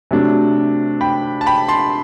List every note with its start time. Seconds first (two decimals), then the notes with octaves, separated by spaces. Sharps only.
0.11 C3 F#3 A3 D4
1.01 G5 B5
1.41 A5
1.46 G5 B5
1.68 A5 C6